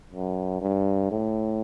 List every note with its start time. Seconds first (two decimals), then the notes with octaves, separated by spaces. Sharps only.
0.13 F#2
0.62 G2
1.11 A2